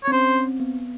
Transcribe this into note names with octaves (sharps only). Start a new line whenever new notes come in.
C4 C#5
C#4 C5
C4
B3